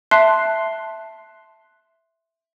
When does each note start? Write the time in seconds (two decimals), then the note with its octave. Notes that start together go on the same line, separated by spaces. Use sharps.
0.11 E5 A5 C6 F#6 C7